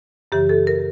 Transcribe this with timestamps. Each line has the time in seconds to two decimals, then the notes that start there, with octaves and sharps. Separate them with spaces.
0.32 F#2 C#3 E3 G4
0.49 A4
0.67 A#4